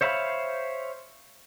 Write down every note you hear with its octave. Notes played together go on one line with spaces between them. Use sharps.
C5 C#5 E5 F5 B5